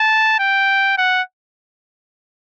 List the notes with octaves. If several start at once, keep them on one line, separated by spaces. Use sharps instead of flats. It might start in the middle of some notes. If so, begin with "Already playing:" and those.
Already playing: A5
G5
F#5